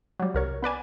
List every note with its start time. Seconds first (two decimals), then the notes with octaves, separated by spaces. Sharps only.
0.20 F#3 G3
0.34 C2 A#4 C#5
0.63 B3 B4 D5 G#5